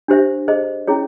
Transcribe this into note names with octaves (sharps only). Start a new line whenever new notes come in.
D4 G4 C5 E5
G#4 C5 D#5
C#4 E4 G#4 C#5